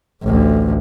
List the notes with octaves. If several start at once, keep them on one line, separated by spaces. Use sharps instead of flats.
A1 D2